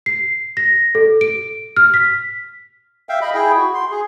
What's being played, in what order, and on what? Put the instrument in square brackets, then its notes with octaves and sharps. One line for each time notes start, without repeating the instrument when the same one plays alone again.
[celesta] C7
A#6
A4
D7
F6
B6
[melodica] E5 F5 G5
D#5 B5
E4 G#4 G5
F#4
C6
G#4